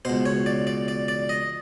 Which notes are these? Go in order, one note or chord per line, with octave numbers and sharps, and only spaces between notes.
C#2 B2 C5
C#5
D5
D5
D5
D5
D#5